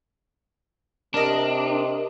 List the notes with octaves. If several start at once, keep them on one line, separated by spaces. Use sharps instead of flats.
C3 D4 A#4 D#5